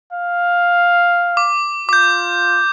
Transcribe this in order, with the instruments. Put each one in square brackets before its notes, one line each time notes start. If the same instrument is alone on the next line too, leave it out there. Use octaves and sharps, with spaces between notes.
[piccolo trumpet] F5
[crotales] D6
[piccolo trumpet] F4 [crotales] D6 G6